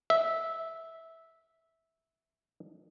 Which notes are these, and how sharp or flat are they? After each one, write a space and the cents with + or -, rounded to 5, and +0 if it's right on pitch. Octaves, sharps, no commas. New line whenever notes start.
E5 -10